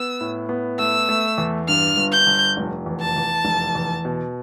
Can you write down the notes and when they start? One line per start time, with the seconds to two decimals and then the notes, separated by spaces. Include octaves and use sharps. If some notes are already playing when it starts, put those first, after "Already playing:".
Already playing: B3 E6
0.21 A2
0.49 B3
0.79 A3 E6
1.09 A3
1.38 E2
1.68 G2 F6
1.97 G1
2.12 G6
2.26 G1
2.57 F1
2.86 E2
3.01 A5
3.16 E2
3.45 F1
3.75 E2
4.05 B2